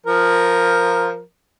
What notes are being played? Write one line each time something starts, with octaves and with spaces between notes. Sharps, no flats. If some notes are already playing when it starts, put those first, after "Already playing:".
F3 A#4